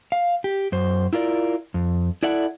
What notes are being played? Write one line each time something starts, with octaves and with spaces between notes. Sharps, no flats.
F5
G4
F#2 C5
E4 F4 A#4 D5
F2
E4 A4 D5 E5 F#5